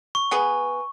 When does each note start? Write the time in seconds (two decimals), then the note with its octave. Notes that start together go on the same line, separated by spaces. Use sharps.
0.15 C#6
0.31 B3 G#4 B4